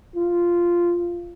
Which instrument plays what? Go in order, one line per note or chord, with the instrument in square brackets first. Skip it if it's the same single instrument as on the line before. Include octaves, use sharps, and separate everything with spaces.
[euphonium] F4